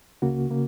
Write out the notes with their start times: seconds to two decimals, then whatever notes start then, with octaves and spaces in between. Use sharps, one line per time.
0.22 C#2 C#3 A#3 F#4
0.50 C#3 A#3